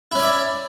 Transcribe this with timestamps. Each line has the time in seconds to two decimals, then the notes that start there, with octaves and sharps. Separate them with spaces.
0.12 E4
0.15 C#4
0.19 D5
0.22 E5